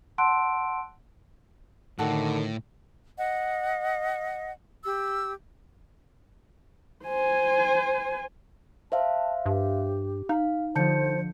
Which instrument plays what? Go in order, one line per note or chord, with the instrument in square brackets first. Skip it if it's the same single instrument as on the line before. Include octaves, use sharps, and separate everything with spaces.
[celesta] F#5 A5 C6 E6 F#6 D7
[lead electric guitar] A2 [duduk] D3 [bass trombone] D#3 [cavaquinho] F#4 A4 D5
[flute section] D#5 F#5
G4 E6
[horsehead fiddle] C5 G#5
[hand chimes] C5 E5 F5 [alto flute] A5
[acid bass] G2 [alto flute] G4
[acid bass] D#4 [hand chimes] F5
[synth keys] D3 F3 [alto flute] C5 [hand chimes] A5 G6 C#7